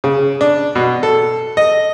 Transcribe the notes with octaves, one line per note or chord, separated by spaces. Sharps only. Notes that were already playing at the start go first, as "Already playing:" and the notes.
C#3
D4
B2
A4
D#5